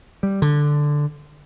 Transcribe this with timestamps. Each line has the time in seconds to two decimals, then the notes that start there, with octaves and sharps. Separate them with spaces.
0.23 G3
0.42 D3